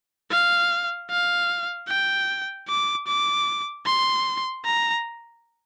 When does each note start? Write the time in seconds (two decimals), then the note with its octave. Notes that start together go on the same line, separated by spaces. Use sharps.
0.31 F5
1.10 F5
1.88 G5
2.68 D6
3.07 D6
3.86 C6
4.65 A#5